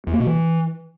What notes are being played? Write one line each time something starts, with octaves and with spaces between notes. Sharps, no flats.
E2
A#3
B2
E3